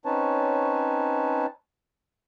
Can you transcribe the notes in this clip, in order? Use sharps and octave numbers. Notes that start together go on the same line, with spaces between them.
C4 C#4 D#4 B4 C#5 A5